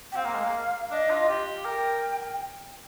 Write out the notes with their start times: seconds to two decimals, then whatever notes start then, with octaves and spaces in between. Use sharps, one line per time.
0.12 G5
0.16 C4 F5
0.25 A#3
0.34 G#3
0.44 A#3
0.91 D4 D#5
1.10 F4
1.29 G4
1.65 A#4 G5